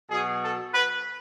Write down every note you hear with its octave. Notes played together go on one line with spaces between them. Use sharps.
B2 F#3 G#4
A4
B4